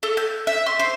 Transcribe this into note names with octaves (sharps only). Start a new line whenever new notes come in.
A4
G6
E5
C6
C5